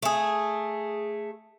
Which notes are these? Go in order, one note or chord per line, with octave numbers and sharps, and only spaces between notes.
A3 G#4